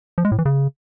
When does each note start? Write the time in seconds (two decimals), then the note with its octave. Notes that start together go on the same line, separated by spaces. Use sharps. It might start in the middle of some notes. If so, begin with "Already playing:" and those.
0.18 F3
0.25 G#3
0.32 A2
0.39 E3
0.45 C#3